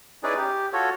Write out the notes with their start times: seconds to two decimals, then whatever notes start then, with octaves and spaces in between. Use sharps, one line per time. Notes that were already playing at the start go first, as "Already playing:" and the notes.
0.23 C#4 D#4 E4 G#4 B4 D5
0.37 G4
0.73 F4 F#4 A4 C#5